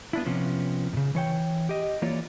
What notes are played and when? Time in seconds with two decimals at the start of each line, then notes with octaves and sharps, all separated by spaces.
0.13 B3 D4 E4
0.26 C3 F3 B3 C#4
0.93 G#2 C#3
1.15 E3 C#5 G5
1.69 G4 D#5
2.02 E3 A#3 F4 C#5 D5